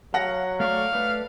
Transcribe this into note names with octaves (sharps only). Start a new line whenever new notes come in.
F#3 F5 F#5 A#6
A3 D5 F5 C#6
A3 B4 D5